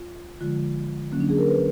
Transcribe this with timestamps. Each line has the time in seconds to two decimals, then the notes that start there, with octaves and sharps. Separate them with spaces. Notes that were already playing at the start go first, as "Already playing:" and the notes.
Already playing: F4
0.41 D3 F3 G#3 F4
1.12 D3 F#3 A#3 C#4
1.20 D4
1.30 G#4
1.38 A#4
1.47 B4